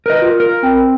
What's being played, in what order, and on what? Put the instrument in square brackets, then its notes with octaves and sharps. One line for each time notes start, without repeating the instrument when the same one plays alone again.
[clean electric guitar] A#4 B4 D#5
[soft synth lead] F4
[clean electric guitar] A#4
[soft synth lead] C4